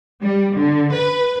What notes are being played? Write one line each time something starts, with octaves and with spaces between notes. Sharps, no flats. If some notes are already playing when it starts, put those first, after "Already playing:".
G3
D3
B4